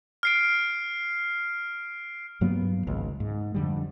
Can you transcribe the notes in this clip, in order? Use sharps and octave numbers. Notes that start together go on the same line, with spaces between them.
F6 C7 D7
G2 F#3 A#3 B3
G#1 C#2
G#2
F2 D3 G3